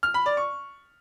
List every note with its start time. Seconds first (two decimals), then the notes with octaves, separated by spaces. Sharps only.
0.03 F6
0.14 B5
0.26 D5
0.37 C#6